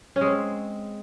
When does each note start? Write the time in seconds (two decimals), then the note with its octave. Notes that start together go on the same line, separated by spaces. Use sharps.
0.16 C#4
0.21 G#3
0.26 C4